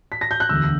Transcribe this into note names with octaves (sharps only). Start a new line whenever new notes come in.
B6
A#6
G6
F#6
E1 D2 D3 E6